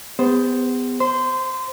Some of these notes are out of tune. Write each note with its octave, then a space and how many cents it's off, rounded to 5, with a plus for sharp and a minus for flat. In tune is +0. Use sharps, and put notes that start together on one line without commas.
B3 +25 G#4 -45 C5 +0
C5 +0 C6 -25